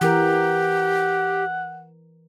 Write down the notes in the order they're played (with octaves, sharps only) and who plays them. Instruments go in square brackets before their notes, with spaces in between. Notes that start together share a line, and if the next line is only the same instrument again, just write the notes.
[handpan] E3 A#4 [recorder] G4 [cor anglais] F#5